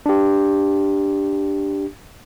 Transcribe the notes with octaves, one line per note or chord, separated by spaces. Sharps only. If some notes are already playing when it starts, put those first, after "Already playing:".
D4 G4